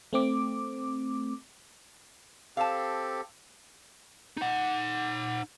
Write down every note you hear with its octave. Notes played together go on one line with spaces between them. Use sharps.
A3 C4 D6
C4 G4 A4 F5 A5
D#4 F#5